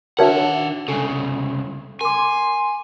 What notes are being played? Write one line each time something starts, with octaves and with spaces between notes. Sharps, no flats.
D#3 D4 F#4 A#4 C#5 E5 F#5 A5
C2 C#3 A4 G#5
A#4 G#5 C6 D6